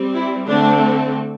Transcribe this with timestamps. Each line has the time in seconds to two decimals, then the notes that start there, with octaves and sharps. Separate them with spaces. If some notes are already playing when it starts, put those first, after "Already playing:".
Already playing: G3 C4
0.14 E4
0.46 D3 A3 C4 D4